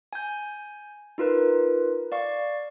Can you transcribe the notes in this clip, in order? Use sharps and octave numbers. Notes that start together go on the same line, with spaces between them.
G#5 G6
D#4 F4 A#4 B4
D5 F5 C#6